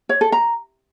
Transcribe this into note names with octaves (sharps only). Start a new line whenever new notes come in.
C#5
A4
A#5